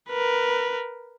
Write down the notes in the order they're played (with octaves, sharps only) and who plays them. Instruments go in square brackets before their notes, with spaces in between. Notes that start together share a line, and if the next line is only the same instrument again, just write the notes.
[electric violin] A#4 B4